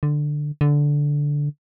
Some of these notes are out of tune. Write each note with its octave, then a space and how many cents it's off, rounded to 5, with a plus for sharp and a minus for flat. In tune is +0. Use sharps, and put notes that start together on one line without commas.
D3 +10
D3 -10